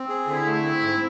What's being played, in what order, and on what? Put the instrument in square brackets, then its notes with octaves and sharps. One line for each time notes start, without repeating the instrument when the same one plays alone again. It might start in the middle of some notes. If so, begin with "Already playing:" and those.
Already playing: [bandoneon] C4
G#4
[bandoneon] D3 [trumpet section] E4
[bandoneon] A3
C4
G#2